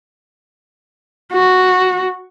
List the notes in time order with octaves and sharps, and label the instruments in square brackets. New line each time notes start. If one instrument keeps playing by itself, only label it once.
[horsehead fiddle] F#4